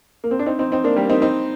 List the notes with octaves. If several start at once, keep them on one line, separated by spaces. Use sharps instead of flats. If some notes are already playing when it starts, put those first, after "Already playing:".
A#3
C4
D4
C4 D#4
C4 D#4
C4 D#4
A#3 D4
G3 A#3
C4 D#4
C4 D#4